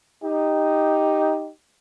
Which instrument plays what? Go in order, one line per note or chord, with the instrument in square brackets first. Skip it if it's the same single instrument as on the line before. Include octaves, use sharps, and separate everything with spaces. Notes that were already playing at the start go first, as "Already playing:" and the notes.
[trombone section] D#4 G4